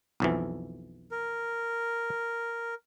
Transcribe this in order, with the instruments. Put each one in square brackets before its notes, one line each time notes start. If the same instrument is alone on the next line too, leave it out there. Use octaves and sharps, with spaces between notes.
[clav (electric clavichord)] B1 F2 E3
[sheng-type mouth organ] A#4